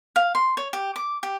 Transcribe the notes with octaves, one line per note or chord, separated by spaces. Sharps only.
F5
C6
C#5
G4
D6
G4